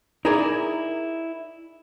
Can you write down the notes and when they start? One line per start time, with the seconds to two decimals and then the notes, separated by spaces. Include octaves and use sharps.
0.25 D#4 E4 G#4 A#4 D5